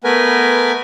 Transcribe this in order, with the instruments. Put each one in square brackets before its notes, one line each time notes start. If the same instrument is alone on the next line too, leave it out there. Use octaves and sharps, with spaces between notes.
[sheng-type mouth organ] A3 B3 A#4 B4 G#5